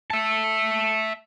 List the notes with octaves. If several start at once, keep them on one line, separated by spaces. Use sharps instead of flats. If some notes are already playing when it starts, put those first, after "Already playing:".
E5 A5